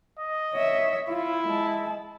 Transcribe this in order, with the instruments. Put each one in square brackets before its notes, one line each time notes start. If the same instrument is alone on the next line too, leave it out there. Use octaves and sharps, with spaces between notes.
[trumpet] D#5
[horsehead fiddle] C#5 E5
[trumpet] E4 [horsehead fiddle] F4
[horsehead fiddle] G#3 A5